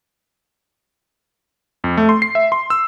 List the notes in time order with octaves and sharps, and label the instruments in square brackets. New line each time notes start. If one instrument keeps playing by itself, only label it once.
[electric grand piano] F2
A3
C6
C7
E5
C6
E6